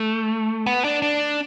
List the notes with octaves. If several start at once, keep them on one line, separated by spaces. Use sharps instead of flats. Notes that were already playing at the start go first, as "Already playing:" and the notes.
Already playing: A3
B3
D4
D4